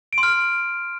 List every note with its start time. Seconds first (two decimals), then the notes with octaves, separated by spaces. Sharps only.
0.13 D7
0.18 C6
0.23 F6